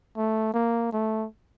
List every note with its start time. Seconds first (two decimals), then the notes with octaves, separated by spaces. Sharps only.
0.17 A3
0.54 A#3
0.93 A3